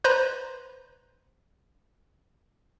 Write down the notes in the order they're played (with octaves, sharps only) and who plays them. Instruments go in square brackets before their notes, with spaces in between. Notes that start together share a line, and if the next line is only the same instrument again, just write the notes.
[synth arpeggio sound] B4 C5 A#5